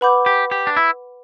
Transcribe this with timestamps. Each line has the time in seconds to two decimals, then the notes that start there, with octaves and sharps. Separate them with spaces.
0.01 B4 F#5 B5 D6 G6
0.26 G4
0.51 G4
0.67 D4
0.77 E4